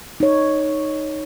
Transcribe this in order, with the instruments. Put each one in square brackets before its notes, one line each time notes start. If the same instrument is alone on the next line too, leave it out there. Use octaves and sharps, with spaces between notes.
[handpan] D#4 C#5